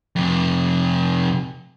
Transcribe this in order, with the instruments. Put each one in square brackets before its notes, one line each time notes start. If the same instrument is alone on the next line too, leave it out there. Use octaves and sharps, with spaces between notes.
[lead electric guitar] F2 C3